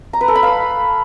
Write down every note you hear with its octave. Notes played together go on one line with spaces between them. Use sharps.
A#5
B4
A4
B5
F5